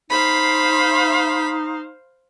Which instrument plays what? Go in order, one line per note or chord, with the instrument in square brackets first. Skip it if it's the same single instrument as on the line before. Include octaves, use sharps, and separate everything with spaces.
[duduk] D#4 [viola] C5 F5 [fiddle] B5